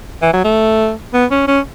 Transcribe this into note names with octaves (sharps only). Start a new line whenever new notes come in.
E3
F#3
A3
B3
C#4
C#4